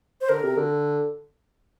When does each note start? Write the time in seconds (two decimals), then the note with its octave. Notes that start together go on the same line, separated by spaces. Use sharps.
0.21 C5
0.29 D3 A#4
0.43 C3
0.57 D3